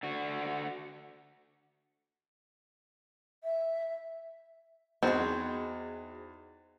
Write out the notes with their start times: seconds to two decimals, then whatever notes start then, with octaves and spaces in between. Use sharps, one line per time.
0.03 D3 F#4
3.44 E5
5.03 E2 C4 D#4 F#4 G#4